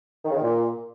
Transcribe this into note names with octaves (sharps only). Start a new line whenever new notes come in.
D#3
C#3
D#3
A#2